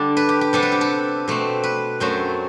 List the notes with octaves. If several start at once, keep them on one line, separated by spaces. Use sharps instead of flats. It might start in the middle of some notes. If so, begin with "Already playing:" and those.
Already playing: D3 G3 D4 D5
B4
G4
G4
C3 G3 B3 D4 A4
B4
G4
A4
B2 A3 C4
B4
F#2 F#3 A3 C4 C5